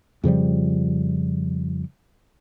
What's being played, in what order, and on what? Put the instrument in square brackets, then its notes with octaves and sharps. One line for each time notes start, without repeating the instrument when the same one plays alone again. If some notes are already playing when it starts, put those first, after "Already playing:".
[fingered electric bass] F2 C#3 F3 G3